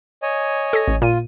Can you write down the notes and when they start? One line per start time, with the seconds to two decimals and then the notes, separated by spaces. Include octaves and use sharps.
0.22 C#5 D#5 G#5
0.73 A4 A#6
0.88 A1
1.02 A#2 F4 D#7